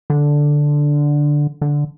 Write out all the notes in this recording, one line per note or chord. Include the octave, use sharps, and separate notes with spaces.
D3
D3